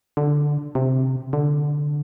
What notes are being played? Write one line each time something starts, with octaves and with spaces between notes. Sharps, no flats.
D3
C3
D3